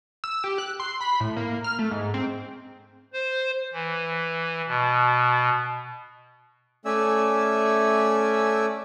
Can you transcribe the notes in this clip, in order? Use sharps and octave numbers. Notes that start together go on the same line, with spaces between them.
E6
G4
F#6
C6
B5
A2
A#3
F6
A3
G#2
C4
C5
E3
B2
A3 C#4 D5 E5 G#5 E6